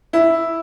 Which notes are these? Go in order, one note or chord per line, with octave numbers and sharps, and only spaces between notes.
E4